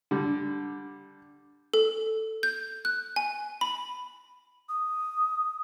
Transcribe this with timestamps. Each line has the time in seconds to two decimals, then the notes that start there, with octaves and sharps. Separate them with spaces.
0.11 D3 G3
1.74 A4
2.43 G6
2.85 F#6
3.16 G#5
3.61 B5
4.69 D#6